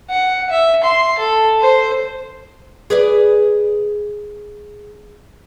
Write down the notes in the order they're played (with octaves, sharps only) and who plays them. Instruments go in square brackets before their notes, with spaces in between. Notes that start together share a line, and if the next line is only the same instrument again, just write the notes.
[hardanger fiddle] F#5
E5
C6
A4
C5
[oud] G#4 B4 D5